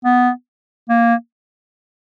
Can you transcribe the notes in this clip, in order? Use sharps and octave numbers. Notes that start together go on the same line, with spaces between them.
B3
A#3